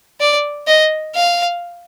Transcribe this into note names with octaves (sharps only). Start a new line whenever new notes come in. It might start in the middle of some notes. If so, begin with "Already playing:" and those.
D5
D#5
F5